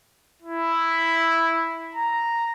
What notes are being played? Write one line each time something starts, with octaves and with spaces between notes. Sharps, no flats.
E4
A#5